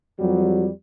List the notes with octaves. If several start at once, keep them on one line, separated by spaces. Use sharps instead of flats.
F2 F#3 G3